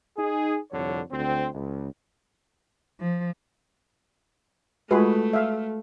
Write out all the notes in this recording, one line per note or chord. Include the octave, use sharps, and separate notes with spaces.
D#4 G#4
C2 F2 D3 C#5
D2 C4
C#2
F3
G#3 A3 F4 F#4 G#4 B4
E5 F5